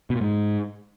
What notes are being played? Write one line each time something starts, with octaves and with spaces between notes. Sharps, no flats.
B2
A#2
G#2